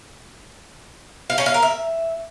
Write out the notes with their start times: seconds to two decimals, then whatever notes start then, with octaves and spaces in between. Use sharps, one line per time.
1.30 F5
1.38 C#4
1.46 F5
1.54 A#4
1.63 E5